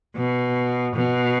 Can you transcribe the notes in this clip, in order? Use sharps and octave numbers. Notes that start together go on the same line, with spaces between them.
B2
B2